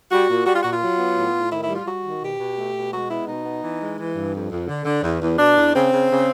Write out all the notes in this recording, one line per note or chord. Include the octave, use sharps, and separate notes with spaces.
G3 F#4
A#2
G3 F#4
F4
A#2 F#4
F4
F#3
B3
A2
A2
D#3 E4
E4
G3
F4
G3 F#4
D#3
B2 G4
B2
A3
B2
G#3 F#4
B3 E4
B2 D#4
B3
E3
G#3
E3
G2
F2
F2
D3
D3
E2
E2
B2 D4
E2
C#3 C4
C#3
C#3